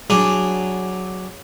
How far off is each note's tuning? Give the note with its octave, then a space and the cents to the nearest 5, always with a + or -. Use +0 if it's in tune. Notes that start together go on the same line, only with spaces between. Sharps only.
F#3 +0 D4 +0 G#4 -10